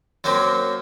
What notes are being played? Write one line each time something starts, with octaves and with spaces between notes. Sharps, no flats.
F#2 F#3 A#3 C4